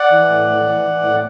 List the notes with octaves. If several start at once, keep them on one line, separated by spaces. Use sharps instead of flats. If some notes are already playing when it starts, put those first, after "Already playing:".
Already playing: D5 F#5
E3
A2
A2
E3
E3
A2